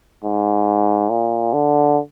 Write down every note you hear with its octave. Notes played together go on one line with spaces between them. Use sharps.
G#2
A#2
D3